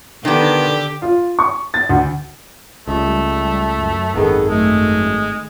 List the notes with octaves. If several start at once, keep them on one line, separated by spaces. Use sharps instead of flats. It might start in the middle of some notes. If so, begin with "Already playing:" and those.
D3 D#3 B3 G4
F4
C#6
A6
D2
C#2 G3 A3
F#2
G#1 D#3 B3 G#4 A4
G#3 A3